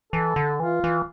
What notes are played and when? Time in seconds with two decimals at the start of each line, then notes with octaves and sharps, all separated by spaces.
0.13 E3 A4
0.36 D3
0.60 E3 F4
0.84 E3